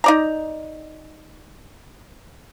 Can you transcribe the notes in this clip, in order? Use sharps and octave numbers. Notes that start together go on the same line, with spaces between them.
D#4 D5 A#5